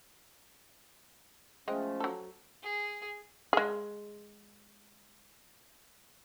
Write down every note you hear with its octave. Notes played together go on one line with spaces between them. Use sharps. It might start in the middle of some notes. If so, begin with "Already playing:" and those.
F3 G#3 A3 C#4 D#5 G5
F#3 A4
G#4
G#3 G#4